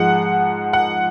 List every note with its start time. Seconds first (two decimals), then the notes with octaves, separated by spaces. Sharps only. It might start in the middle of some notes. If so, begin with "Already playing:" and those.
Already playing: G#2 F3 G#3 F#5
0.73 F#5